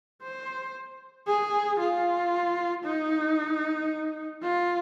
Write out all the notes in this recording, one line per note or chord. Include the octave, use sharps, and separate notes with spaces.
C5
G#4
F4
D#4
F4